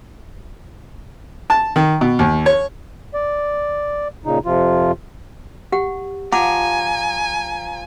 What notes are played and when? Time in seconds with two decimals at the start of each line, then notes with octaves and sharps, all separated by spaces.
1.50 A5
1.76 D#3
2.01 B2
2.19 D#2
2.46 C#5
3.14 D5
4.26 A#2 C#3 D#4
4.46 F2 C3 F3 F4
5.72 G4 F#5
6.32 F3 F#5 G#5 A#5 D6